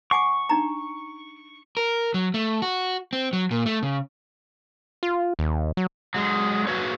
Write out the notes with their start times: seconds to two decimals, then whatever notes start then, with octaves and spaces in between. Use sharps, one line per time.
0.11 F#5 G#5 C#6 D6
0.49 D4 D#4 A#5
1.77 A#4
2.14 F#3
2.34 A3
2.62 F#4
3.13 C4
3.33 F#3
3.51 A#2
3.66 A3
3.83 C#3
5.03 F4
5.39 D#2
5.77 F#3
6.14 F#3 G#3
6.67 A#3 F#4 B4 C#5